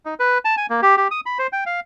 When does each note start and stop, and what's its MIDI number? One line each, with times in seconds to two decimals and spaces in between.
0.06 0.14 63
0.20 0.38 71
0.45 0.55 81
0.57 0.66 80
0.70 0.80 58
0.82 0.96 67
0.97 1.08 67
1.11 1.21 87
1.26 1.38 83
1.39 1.47 72
1.52 1.64 79
1.66 1.80 77